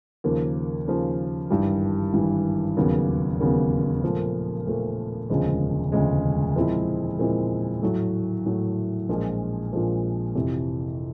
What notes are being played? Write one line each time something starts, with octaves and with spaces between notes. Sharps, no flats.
D#2 C#3 F3 A#3
D#2 C#3 F3 A#3
G#1 G2 E3 G3
G#1 G2 E3 G3
E1 D#2 C#3 F#3 B3
E1 D#2 C#3 F#3 B3
A#2 F3 A3
A#2 F3 A3
E1 D2 C#3 F3 G#3
E1 D2 C#3 F3 G#3
A#2 F3 G#3 C4 E4
A#2 F3 G#3 C4 E4
A2 F#3 A3
A2 F#3 A3
A#1 A#2 F3 G#3
A#1 A#2 F3 G#3
F2 C3 E3